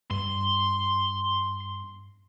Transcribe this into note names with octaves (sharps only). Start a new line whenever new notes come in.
G2 C6